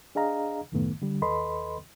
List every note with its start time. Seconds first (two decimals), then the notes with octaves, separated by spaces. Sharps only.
0.15 D4 G#4 D#5 F5 A#5
0.72 C2 F#2 A2 D#3 A3 B3
1.02 D3 G3
1.22 D#2 A4 B4 D#5 B5 C6